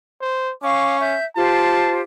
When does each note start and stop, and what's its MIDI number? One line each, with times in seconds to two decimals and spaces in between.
0.21 0.53 72
0.62 1.17 61
0.62 1.00 77
0.62 1.00 85
0.62 1.00 86
1.01 1.25 76
1.01 1.25 91
1.36 2.00 65
1.36 2.00 67
1.36 2.00 72
1.36 1.99 81